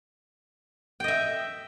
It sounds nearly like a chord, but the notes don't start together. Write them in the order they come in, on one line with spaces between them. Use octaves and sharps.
G5 D#5 E5